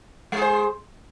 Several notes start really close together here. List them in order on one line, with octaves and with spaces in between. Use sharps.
G#3 G#4 C5